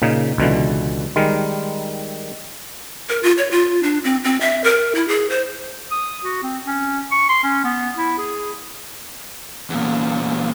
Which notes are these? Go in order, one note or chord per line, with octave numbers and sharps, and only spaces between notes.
A#2 C#3 D#4
C#2 B2 D3 E3
D#3 G3 G#3 A#4
A#4
F4
C#5
F4
D4
C4
C4
E5
A#4
E4
G#4
C5
D#6
F#4
C4
C#4
C#6
C6
C#4
B3
E4
G#4
E2 A#2